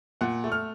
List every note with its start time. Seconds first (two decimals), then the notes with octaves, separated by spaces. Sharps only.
0.21 A#2 F#5
0.44 A3
0.52 F6